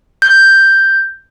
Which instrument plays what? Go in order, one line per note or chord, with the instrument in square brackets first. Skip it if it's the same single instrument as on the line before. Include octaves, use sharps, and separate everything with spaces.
[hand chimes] G6